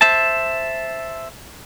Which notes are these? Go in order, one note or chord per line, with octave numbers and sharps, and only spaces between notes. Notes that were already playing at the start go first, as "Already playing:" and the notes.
C5 E5 A5